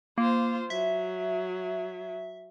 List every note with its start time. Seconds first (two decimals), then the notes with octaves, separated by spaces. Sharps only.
0.18 A#3 F4 C5
0.70 F#3 E5